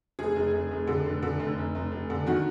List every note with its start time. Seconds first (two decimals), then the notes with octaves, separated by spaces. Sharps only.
0.19 F1 G#4
0.36 F1
0.53 F1
0.71 F1
0.87 D3
1.06 F1
1.23 D3
1.40 F1
1.58 F1
1.75 F1
1.92 F1
2.10 D3
2.26 D#3 F#4